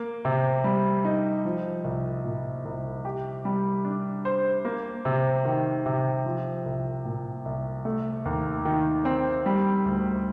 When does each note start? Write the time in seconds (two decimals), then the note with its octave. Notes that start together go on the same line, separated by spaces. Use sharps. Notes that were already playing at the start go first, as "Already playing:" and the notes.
Already playing: A#3
0.25 C3
0.64 G3
1.05 D#4
1.45 F3
1.84 C2
2.24 A#2
2.65 C2
3.05 G4
3.45 G3
3.85 D4
4.25 C5
4.65 A#3
5.05 C3
5.45 D#3
5.86 C3
6.26 F3
6.66 C2
7.05 A#2
7.45 C2
7.85 A3
8.25 D#2
8.65 D#3
9.05 C4
9.46 G3
9.85 D2